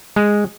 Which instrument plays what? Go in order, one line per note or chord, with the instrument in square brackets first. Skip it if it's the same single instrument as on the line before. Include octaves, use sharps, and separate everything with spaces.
[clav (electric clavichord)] G#3